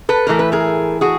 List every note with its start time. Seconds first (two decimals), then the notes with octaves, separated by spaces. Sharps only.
0.09 A4 B4
0.27 A2 E3 A3 A#4
0.39 B4
0.52 G#4 A#4
1.01 F#4 G#4